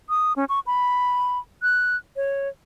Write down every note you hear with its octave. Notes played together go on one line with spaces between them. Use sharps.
D#6
C#4
C#6
B5
F#6
C#5